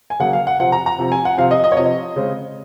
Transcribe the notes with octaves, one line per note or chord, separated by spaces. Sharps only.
G#5
C#3 F#3 A#3 F#5
F5
F#5
C3 F3 C4 F#5
A#5
A#5
C3 F3 C4
G#5
F#5
C3 F3 C4 F5
D#5
D#5
C#5
C3 F3 C4 D#5
C#3 G#3 C4